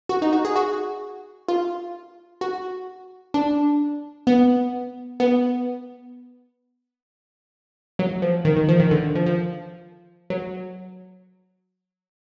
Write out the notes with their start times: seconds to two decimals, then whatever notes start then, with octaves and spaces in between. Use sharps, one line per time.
0.09 F#4
0.22 D#4
0.33 F#4
0.45 G#4
0.56 F#4
1.49 F4
2.41 F#4
3.34 D4
4.27 B3
5.20 B3
7.99 F#3
8.22 F3
8.45 D#3
8.56 D#3
8.69 F3
8.80 D#3
8.91 D3
9.15 F3
9.27 F3
10.30 F#3